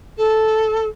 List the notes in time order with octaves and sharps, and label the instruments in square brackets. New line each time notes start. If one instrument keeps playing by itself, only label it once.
[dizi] A4